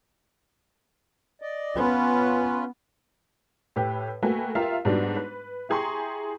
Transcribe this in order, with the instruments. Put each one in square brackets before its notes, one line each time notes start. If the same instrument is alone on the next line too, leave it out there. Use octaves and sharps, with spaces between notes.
[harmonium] D5 D#5
[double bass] B3 [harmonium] C#4 F4 B4
[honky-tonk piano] A2 G4 B4
A3 A#3 F#4 B4 G5 G#5
F4 G4 A#4 E5 F5
G#2 G3 B3 D4 F#4
B4
E4 G4 G#4 A#5 C6 C#6